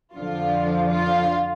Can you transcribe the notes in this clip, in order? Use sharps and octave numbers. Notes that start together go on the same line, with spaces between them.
F2 D3 F3 F4
F4